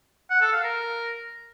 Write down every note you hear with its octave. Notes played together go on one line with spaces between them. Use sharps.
F#5
A4
F5
A#4